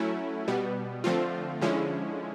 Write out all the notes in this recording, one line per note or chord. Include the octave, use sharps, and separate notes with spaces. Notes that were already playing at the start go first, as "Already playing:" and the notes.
Already playing: F#3 A3 C#4 E4
B2 G3 B3
D3 F3 A3 C4 F4
D3 F3 G#3 C#4 E4